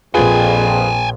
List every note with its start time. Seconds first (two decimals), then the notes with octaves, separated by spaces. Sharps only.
0.15 A#1 F2 F4 G#4 B4 G5 G#5